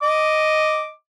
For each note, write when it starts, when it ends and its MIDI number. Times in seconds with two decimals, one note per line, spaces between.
0.02 0.90 75
0.02 0.90 86